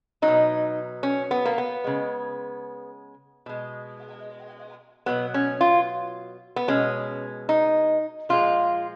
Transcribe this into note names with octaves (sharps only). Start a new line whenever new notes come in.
F#3 D#4
B2
C#4
B3
A#3
B3
C#3 G#3
B2 G#3
B2 F#3 B3
C#4
F4
B3
B2 G#3 C#4
D#4
A#2 F3 G#3 F4